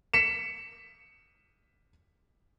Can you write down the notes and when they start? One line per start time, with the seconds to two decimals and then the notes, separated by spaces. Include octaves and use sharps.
0.14 B6 C#7 E7